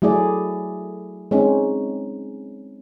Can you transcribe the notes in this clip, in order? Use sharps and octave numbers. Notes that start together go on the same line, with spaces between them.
F#3 A3 E4 G#4 D5
G#3 C4 C#4 D#4